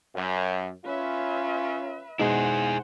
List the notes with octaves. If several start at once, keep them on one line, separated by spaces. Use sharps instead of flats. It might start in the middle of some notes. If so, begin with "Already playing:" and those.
F#2
C#4 F4 B4 E5
B2 G#3 D#4 E4 G#4 C5 F#5